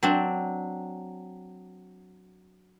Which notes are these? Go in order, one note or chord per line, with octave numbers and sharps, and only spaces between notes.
F#3 C4 D4